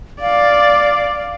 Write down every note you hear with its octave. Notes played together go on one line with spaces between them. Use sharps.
D5 F5